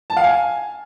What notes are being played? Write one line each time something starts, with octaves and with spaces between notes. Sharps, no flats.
A5
F5
G#5